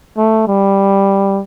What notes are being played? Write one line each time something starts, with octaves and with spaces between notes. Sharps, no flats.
A3
G3